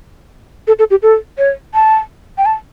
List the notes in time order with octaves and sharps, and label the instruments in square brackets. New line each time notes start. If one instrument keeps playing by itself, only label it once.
[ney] A4
A4
G4
A4
C#5
A5
G5
A5